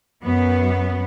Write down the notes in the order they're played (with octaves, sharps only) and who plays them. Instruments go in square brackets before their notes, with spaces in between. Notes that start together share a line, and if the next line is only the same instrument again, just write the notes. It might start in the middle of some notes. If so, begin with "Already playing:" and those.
[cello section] F#2 B3